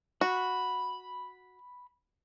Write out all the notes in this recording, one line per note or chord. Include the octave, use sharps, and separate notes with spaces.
F#4 B5